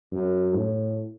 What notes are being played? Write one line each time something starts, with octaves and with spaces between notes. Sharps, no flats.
F#2
A2